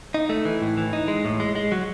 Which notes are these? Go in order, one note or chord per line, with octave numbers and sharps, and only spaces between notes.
D#4
A3
E3
A2
E3
D#4
G#3
A2
G#3
G#3
F#3